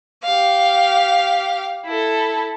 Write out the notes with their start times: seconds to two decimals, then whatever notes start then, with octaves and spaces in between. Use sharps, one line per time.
0.24 G4 F5
1.86 E4 A4